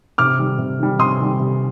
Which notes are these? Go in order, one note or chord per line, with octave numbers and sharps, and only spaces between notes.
C3 D6 F6
D#3 G3
C3
D#3 G3
C3 C6 D#6
D#3 G3
C3